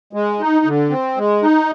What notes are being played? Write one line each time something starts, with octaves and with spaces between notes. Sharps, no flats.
G#3
D#4
D3
C4
G#3
D#4